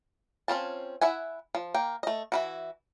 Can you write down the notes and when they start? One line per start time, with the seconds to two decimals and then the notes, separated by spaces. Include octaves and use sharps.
0.48 C4 C#4 F4 A5
1.01 E4 E5 F#5 G#5
1.55 F3
1.74 A#3 G5
2.03 A3 D#5
2.32 E3 E4 F#4